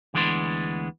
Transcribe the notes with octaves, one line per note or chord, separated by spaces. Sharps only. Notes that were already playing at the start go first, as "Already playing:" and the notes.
D2 E3 G#3 B3 D4 C6